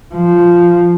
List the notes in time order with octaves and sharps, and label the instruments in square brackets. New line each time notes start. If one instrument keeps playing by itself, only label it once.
[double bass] F3